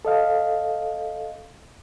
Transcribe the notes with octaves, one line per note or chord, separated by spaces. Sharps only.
A4 D#5 F5